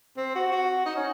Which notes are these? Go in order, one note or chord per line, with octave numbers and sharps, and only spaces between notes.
C4
F#4
F#4
D#4
C#4